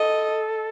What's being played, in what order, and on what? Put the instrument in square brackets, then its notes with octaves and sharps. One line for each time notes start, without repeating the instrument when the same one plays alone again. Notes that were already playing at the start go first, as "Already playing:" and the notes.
Already playing: [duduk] A4 [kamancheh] D#5